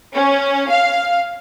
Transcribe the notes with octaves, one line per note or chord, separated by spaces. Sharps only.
C#4
F5